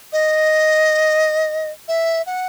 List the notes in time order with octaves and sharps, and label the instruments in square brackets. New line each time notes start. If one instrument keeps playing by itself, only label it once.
[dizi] D#5
E5
F#5